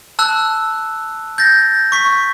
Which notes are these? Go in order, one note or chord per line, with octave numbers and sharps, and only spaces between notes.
A5 E6 F#6
G6 A6 A#6
C#6 B6